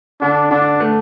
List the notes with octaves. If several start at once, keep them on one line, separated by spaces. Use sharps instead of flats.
D3 D4
D3 D4
A3